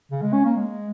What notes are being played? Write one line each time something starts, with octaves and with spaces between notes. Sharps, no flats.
C#3
G#3
C#4
A#3
G#3